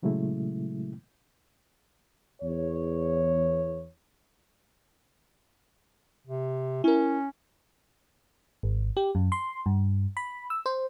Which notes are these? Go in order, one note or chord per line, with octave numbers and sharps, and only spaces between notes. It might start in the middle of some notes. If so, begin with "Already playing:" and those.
A#2 C#3 F#3 G#3 A3 E4
E2 C#5
C3
C#4 E4 A#4
G#1
G4
F#2
C6
G2
B5
E6
C5